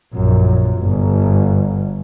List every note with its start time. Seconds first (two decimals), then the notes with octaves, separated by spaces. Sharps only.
0.15 A#1 F#2
0.79 G1